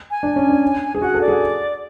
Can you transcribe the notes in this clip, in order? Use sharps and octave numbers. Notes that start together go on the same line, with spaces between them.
G#5
D4
C#4
D4
G#4
F#4 F#5
A4
D5
G#4